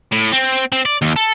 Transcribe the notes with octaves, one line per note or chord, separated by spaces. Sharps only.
A2
C4
C4
D5
D#2
A4